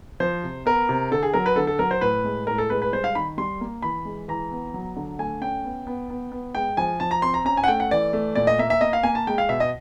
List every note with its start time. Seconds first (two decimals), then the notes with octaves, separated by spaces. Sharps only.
0.20 F3 C5
0.43 C3
0.66 B3 A#4
0.89 C3
1.12 D3 A4
1.23 G#4
1.34 F#3 A#4
1.46 B4
1.56 D3 A4
1.67 A4
1.79 F#3 A#4
1.91 C5
2.01 A2 B4
2.24 G#3
2.47 A2 A#4
2.58 A4
2.70 G#3 B4
2.82 B4
2.93 G3 C5
3.04 F5
3.15 D#3 B5
3.38 G3 C6
3.61 A#3
3.82 E3 B5
4.05 G#3
4.28 E3 A#5
4.51 B3
4.74 F#3
4.96 D3
5.18 A3 G#5
5.41 C#4 G5
5.64 B3
5.87 B3
6.10 B3
6.32 B3
6.55 G#3 G5
6.77 F3 G#5
7.00 F3 A5
7.11 A#5
7.22 C4 C6
7.34 A#5
7.45 C#4 A#5
7.57 G#5
7.64 F#5
7.68 A3 G5
7.80 F#5
7.91 E3 D5
8.13 A3
8.35 A#2 D5
8.47 D#5
8.59 A#3 E5
8.70 E5
8.81 A#3 D#5
8.93 F5
9.03 A#3 G#5
9.15 A5
9.27 G#3 G5
9.38 F5
9.49 B2 E5
9.60 D#5